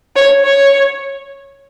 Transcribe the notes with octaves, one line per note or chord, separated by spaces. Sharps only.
C#5
C#5